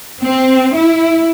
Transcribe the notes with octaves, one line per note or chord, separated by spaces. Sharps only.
C4
E4